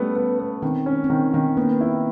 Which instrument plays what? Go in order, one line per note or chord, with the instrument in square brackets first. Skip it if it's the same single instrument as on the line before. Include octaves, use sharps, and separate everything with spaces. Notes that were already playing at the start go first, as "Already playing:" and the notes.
Already playing: [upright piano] G3 A3 B3 [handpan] C#4
[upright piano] B3
B3
[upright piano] D#3 [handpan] C4
[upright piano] C#4
[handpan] C4
[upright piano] D#3 [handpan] B3
[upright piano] D#3 [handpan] C4
[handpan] A#3 [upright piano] B3
[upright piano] E4